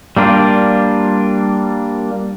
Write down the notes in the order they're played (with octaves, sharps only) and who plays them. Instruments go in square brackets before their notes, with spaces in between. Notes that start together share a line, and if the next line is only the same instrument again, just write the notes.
[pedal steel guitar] G3 A#3 D4 F4